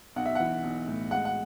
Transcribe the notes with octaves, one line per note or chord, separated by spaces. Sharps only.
B1 F#5
E5
E3 F#5
B1
A2
G#3 F#5
F#5